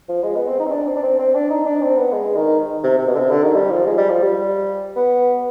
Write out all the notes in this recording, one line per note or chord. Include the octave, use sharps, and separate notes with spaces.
F3
G#3
B3
C4
D#4
C4
D4
C4
D4
C4
C4
D4
D#4
D4
C4
B3
G#3
D#3
C3
C3
B2
D3
C3
D3
D#3
G3
F3
G#3
G3
F3
G3
B3